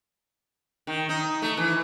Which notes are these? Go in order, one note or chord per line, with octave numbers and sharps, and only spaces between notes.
D#3
D#4
A3
E3